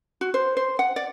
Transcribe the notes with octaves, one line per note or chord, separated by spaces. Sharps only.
F#4
C5
C5
F#5
D5